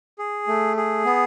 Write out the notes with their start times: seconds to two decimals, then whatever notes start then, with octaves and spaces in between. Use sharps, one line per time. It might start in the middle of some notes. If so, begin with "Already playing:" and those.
0.19 G#4
0.47 A3
0.77 G#4
1.05 B3